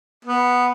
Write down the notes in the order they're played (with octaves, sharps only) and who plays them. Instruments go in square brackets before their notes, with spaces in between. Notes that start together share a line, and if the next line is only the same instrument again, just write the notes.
[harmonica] B3